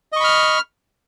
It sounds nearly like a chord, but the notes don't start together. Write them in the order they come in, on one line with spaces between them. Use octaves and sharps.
D#5 C#6 B5 F6